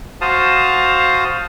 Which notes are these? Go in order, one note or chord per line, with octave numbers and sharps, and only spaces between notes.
F#4 C5 F5 A5 D#6